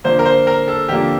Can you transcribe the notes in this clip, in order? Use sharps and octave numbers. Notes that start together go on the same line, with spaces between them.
D3 F3 A#3 C5
A#4
C5
A#4
A4
D3 F3 A#3 G4